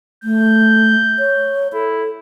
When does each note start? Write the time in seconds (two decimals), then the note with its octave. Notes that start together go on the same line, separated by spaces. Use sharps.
0.24 A3 G6
1.19 C#5
1.73 E4 A4